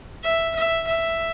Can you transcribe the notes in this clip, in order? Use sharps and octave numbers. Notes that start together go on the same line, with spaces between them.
E5
E5
E5